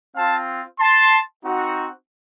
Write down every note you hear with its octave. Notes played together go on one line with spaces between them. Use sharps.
C4 F4 F5 A5
A5 C6
C4 D#4 F#4